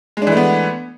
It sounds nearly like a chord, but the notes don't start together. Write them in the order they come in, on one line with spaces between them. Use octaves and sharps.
G#3 D4 E3 A3 B3